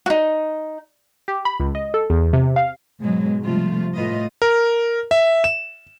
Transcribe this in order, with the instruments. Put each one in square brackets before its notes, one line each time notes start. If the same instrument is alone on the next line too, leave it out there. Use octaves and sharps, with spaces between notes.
[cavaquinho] D#4 F#4
[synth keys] G4
B5
C#2
D#5
A4
E2
C3
F5
[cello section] G#2 B2 F#3 G#3
C3 F3 G3 A3 F4
A2 A3 F4 B4 D#5
[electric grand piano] A#4
E5
E7